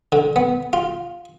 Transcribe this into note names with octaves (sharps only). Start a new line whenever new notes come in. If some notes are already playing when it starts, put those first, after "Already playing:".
D3
B3
F4